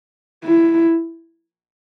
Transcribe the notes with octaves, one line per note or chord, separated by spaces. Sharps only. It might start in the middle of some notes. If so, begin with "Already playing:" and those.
E4